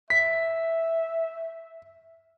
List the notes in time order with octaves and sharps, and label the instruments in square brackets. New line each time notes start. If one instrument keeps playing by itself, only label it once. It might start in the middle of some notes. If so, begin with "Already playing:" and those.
[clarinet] E5 [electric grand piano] B6